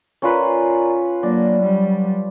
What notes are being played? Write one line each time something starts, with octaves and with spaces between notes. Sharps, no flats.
C#4 F4 A#4 B4 D5 A#5
F#3 A#3 D4
F#3 G3